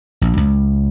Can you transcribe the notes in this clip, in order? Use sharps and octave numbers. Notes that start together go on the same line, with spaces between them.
A#1
C#2